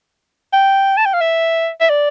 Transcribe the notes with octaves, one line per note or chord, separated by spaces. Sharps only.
G5
A5
G5
F5
E5
E5
D5